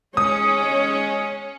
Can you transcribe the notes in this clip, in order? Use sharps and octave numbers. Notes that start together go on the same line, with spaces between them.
G#3 C#4 C#5 D#6